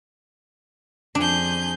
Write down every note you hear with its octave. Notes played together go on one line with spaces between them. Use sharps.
F2 D4 G#4 G6